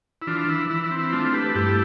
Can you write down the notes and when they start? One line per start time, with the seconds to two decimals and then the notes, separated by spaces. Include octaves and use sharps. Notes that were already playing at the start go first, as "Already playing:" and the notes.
0.22 E4
0.27 E3 D4 F4
0.48 E3 E4
0.69 E3 E4
0.84 E4
0.91 C4
0.99 E4
1.12 A3 D4 F4
1.33 A3 G4 B4
1.55 G2 E4 G4